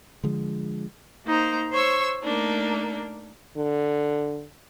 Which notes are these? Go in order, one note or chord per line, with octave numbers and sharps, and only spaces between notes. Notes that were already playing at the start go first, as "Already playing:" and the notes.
D3 F3 G#3
A#3 D#4 C5 A#5
C5 C#5 C#6 E6
A3 A#3 D4 D#4
D3